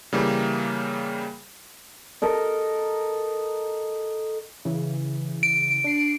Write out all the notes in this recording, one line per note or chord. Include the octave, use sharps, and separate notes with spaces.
C#3 E3 G3 A#3
A4 A#4 D#5
C#3 E3
D7
D4 C7